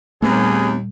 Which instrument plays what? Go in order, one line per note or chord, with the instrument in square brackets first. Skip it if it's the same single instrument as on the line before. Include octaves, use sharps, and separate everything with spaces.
[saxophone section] D#2 [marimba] A#2 G3 [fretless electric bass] A3 B3 C4 [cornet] G#4